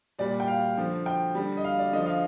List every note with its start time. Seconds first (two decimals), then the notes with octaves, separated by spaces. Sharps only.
0.19 A#2 G3 D5
0.40 G5
0.48 F5
0.77 D3 F3
1.06 G5
1.35 D3 G3
1.57 D#5
1.64 F5
1.79 D5
1.93 D3 F3 D#5
2.06 F5